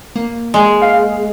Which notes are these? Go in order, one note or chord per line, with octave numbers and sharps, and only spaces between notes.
A#3
G#3
F5